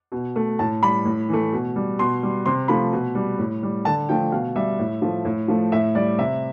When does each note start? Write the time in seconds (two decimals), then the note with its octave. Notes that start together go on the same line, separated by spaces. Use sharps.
0.12 B2
0.36 A3
0.59 A2 A5
0.82 G3 B5
1.05 A2
1.29 E3 A3
1.53 B2
1.76 G3
1.99 B2 C6
2.23 G3
2.46 C3 C6
2.68 F3 A3 B5
2.93 B2
3.15 G3
3.38 A2
3.63 G3
3.85 D3 A5
4.09 F3 A3 G5
4.32 B2 F5
4.55 G3 E5
4.79 A2
5.02 F3 A3
5.25 A2
5.48 F3 A3
5.72 A2 E5
5.95 G3 D5
6.18 C3 E5